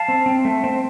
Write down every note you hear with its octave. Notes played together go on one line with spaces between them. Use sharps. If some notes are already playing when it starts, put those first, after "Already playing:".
Already playing: F5 A5
C4
C4
A3
C4